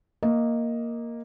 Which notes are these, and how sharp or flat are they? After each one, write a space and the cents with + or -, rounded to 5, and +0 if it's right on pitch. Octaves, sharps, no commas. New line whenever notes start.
A#3 +0 D#5 +5